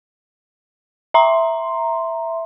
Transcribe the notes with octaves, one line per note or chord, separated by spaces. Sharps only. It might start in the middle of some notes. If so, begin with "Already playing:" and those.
E5 A#5 C6